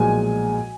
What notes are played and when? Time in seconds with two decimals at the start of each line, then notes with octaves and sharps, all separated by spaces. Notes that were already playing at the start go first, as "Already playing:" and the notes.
Already playing: B1 A#2 F3 G#3 G#5